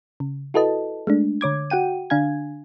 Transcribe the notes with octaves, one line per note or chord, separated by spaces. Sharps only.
C#3
E4 F#4 A4 B4 D#5 A5
G#3 A3 D4
D3 C#5 D6 G#6
F#4 F#5 G5 D#7
D3 D4 F5 G#5 G#6